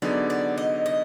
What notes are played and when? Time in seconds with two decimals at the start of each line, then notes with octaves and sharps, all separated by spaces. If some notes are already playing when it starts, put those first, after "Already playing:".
0.02 D3 F#3 B3 D#4 G#4 D5
0.30 D5
0.58 D#5
0.86 D#5